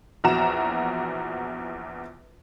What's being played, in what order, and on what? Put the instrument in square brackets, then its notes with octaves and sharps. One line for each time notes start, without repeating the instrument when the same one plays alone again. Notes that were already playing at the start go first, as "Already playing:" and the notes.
[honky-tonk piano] A#1 E2 F#4 A#5 E7